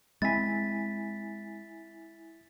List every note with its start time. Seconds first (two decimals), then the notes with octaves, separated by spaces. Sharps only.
0.22 G#3 C4 E4 G#5 A6 B6